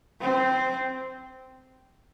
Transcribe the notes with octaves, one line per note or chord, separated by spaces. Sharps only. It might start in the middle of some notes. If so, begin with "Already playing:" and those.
C4